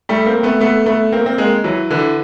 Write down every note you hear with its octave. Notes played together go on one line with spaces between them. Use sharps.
G3 A3
A#3 C4
A3 B3
A3 B3
A3 B3
A#3 C4
A#3 C4
G#3 A#3
E3 F#3
D3 E3